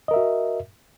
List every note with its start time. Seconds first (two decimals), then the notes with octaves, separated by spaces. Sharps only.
0.08 D#5
0.11 A#4
0.14 E5
0.16 F#4